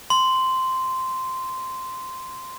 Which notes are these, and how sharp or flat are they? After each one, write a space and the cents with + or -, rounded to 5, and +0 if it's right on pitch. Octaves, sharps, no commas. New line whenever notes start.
C6 -10